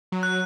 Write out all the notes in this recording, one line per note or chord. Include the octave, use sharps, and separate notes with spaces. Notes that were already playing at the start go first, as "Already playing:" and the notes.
F#3
F#6